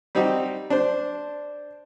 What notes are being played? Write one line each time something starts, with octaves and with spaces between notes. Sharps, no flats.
G3 C4 D#4 F#4 G4
D4 C5